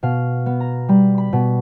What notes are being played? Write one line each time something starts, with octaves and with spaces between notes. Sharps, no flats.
B2 F5
B3
A#5
G3 B5
B5
B2